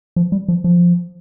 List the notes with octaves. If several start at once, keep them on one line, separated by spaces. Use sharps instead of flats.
F3
G3
F3
F3